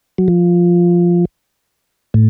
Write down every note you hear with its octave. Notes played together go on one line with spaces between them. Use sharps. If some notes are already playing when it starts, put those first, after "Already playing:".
F#3
F3
A2